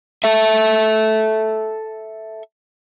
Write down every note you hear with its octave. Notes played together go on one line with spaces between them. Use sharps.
A4 E5